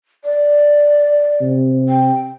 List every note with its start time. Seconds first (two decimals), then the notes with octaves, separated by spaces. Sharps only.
0.24 D5
1.41 C3
1.89 G5